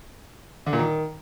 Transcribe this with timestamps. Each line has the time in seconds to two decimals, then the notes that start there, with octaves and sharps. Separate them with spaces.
0.66 D3
0.73 A#2
0.79 D#3